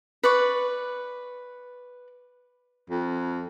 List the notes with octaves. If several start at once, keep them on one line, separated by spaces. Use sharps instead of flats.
B4 D5 C#6
F2